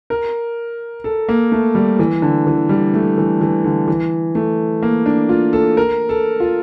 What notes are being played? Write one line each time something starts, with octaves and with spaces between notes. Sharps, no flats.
A#4
A4
A#3
A3
G3
E3
D3
E3
G3
A3
E3
E3
D3
E3
A3
A#3
D4
F4
A4
A#4
A4
F4